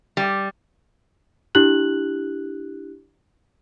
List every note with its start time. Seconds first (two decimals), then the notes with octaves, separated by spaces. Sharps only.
0.17 G3
1.55 D4 E4 G4 F#6 F#7